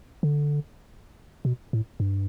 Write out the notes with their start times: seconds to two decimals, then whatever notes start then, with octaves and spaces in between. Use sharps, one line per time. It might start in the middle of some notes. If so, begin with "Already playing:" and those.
0.23 D3
1.45 B2
1.73 A2
2.00 G2